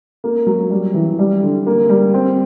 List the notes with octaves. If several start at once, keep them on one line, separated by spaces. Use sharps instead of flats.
A#3
F#3
G3
E3
G3
D3
A#3
G3
C4